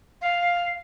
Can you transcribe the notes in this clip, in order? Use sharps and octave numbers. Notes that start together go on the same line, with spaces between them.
F5